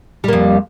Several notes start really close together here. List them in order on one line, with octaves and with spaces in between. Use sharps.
G3 A#3 F2